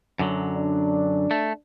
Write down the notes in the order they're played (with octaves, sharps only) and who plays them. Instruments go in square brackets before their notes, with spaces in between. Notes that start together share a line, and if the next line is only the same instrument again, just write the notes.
[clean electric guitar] F#2 D3 F#3
[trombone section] D4
[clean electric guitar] A3